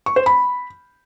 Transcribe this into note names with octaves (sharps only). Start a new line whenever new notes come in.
C#6
C5
B5